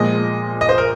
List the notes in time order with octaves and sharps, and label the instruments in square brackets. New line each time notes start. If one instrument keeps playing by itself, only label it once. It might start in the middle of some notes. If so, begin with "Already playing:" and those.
Already playing: [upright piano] A#2 F3 G#3 [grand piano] D#5
[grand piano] D#5
C5
A#4